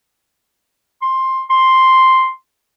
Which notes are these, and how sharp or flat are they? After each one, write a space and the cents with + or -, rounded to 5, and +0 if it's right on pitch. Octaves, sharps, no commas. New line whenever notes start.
C6 +10
C6 +0